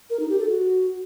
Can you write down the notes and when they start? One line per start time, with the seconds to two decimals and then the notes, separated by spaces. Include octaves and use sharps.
0.10 A#4
0.20 D#4
0.29 G4
0.39 A4
0.49 F#4